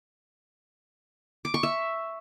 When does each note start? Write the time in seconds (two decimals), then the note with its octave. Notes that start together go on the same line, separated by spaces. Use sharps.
1.45 D6
1.54 C#6
1.63 E5